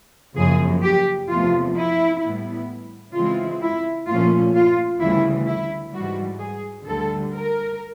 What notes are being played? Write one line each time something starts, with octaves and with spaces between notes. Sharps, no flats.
F#2 C#3 F3 A#3 G#4
G4
E2 C3 F3 A3 F4
E4
A2 E3 G3 B3 E4
C#3 E3 G#3 C4 E4 F4
E4
A#2 F3 A3 C#4 F4
F4
D2 C#3 E3 G3 E4
E4
G#2 E3 G3 F#4
G#4
D2 D3 G3 A4
A#4